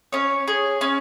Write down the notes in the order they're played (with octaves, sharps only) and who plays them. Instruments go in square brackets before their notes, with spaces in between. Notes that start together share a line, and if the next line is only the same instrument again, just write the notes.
[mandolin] C#4 C#5
G#4
C#4